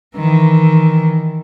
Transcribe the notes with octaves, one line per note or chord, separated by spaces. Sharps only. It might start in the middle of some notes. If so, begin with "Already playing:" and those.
D#3 E3